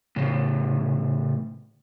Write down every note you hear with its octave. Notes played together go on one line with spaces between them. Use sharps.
A2 C#3